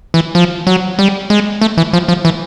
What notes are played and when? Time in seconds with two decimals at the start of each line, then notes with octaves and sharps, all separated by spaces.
0.14 E3
0.35 F3
0.67 F#3
0.99 G3
1.30 G#3
1.61 A3
1.77 E3
1.93 F3
2.08 F3
2.25 E3